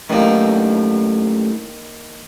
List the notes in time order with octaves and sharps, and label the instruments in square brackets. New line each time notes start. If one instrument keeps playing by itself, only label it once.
[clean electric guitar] F#2 A2 G3 [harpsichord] D#3 A#3